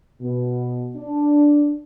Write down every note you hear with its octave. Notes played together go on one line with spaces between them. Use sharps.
B2
D4